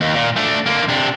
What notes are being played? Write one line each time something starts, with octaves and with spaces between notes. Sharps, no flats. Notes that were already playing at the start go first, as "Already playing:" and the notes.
D#2
A#2
A3 D4
D3 A#3
C3 D4